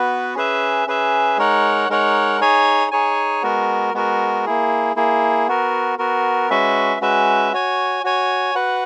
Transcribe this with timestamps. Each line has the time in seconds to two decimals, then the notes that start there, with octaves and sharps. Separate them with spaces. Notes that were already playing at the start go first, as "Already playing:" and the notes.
Already playing: B3 F#4 B4
0.35 C#4 G#4 B4 E5
0.87 C#4 G#4 B4 E5
1.37 G#3 D#4 A#4 C#5 F#5
1.89 G#3 D#4 A#4 C#5 F#5
2.40 D#4 G#4 C#5 G#5
2.91 D#4 G#4 C#5 G#5
3.42 G#3 B3 F#4 A#4
3.94 G#3 B3 F#4 A#4
4.46 A#3 E4 G#4
4.96 A#3 E4 G#4
5.48 B3 F#4 A#4
5.99 B3 F#4 A#4
6.50 G#3 C#4 F#4 B4 E5
7.01 G#3 C#4 F#4 B4 E5
7.53 F#4 C#5 G#5
8.04 F#4 C#5 G#5
8.55 F#4 B4 F#5